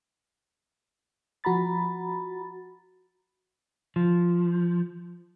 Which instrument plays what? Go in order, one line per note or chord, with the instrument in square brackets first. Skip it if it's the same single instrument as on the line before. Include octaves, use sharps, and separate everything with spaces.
[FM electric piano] F3 F#4 A#5 B5 A6
[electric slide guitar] F3